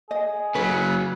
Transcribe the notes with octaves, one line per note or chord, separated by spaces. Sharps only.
G#4 D#5
C#3 F#3 B4